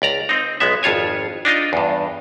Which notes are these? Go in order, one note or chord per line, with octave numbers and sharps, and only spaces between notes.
C#2 D5 A#5
C4 D#4
B1 G#3 B3 E5
G#1 F2 F4 C#5 G#5
D4 D#4 F4 D#5
E2 G2